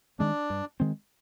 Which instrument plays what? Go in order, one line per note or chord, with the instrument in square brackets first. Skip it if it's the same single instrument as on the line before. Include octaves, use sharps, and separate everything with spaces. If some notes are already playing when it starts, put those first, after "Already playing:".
[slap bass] D#3 G#3 C4 [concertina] D4
[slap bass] G2
D#3 G#3 C4